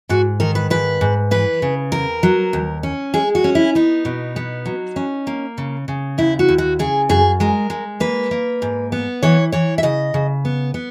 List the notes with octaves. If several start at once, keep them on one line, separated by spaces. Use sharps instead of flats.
G#2 F#4
D#3 A#4
B4
G#2 B4
G#2
E3 B4
C#3
E2 A#4
F#3
D#2
C#4
G#3 G#4
F#4
C#4
E4
B3 D#4
B2
B3
F#3
C#4
A#3
C#3
C#3
D#2 E4
F#4
D#2
F#4
C#3 G#4
F#2 G#4
G#3 A#4
G#3
A#3 B4
A#3
G#2
B3
E3 C#5
E3 C#5
E5
C#3 D#5
C#3
B3
B3